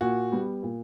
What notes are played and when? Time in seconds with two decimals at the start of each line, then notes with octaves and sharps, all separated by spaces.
0.01 A#2 F#4
0.32 G3 B3
0.63 A#2